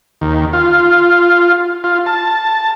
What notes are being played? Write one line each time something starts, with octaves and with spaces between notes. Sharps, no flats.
D#2
F4
F4
A5